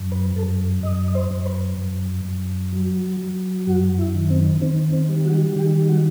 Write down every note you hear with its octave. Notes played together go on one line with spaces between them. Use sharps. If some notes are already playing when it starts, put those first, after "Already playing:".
Already playing: F#2
B4
F#2 A4
F#2 D#5
D#5
C5
F#2
C5
B4
F#2
F#2
F#3
F#3
F#2 F#4
E4
D#3
C4
D#3 C4
C4
G3
F#4
D#3 G4
F#4